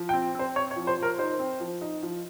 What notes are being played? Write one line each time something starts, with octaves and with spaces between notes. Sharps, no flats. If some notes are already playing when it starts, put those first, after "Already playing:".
Already playing: F3
G5
C4
C4 C5
C4 C#5
C#5
F3
C5
F3
A#4
D#4 C5
C4
F3
D#4
F3